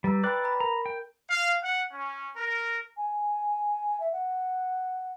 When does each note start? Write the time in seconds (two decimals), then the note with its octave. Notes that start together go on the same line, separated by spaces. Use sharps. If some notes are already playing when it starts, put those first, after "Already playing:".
0.04 G3 B4 A#5 E6
0.24 B4 D5 G5 B5 D6 F#6
0.44 A#5 B5
0.60 A#4 A#5
0.86 G5
1.29 F5
1.62 F#5
1.91 C#4
2.36 A#4
2.97 G#5
4.00 E5
4.12 F#5